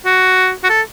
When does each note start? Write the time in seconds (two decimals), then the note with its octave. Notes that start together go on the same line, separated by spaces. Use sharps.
0.06 F#4
0.64 F#4
0.70 A4